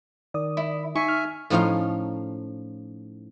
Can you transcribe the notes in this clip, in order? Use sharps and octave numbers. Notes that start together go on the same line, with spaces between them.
D#3 D5 D#6
E4
D#4 E5 G#5 C#6
F6
A2 F3 C#4 D#4 F4 F5